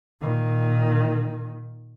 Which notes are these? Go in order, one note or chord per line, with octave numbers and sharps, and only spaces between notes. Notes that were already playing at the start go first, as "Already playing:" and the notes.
A#2 D#3